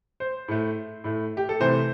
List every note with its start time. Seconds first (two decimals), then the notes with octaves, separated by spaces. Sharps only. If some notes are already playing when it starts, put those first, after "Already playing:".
0.20 C5
0.48 A2 A3
1.04 A2 A3
1.37 G4
1.49 A4
1.60 C3 E3 A3 C5